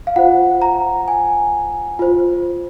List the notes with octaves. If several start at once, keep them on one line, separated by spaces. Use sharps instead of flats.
F5
F4 C5 F#5
A#5
G#5
F4 C5